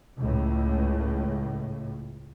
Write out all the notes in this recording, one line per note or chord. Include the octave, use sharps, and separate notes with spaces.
C#2 A2